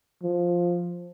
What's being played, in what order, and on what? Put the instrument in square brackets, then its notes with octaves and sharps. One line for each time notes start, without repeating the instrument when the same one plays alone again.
[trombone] F3